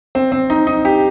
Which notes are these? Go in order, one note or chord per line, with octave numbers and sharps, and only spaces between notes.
C4
C4
D#4
D#4
G4